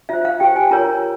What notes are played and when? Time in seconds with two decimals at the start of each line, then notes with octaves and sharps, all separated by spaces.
0.09 F4 C5 E5
0.25 F5
0.40 G4 C5 G5
0.56 G#5
0.71 F4 A#4 C#5 A#5